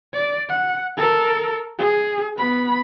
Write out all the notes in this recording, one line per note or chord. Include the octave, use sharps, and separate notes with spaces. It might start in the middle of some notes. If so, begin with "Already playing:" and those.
D5
F#5
A4 A#4
G#4
B3 B5